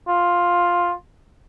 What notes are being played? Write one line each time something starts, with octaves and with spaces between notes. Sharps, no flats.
F4